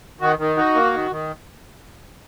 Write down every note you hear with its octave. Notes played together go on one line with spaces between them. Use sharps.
D#3 F#4
D#3
D#4 F#4
A#3
D#3
D#3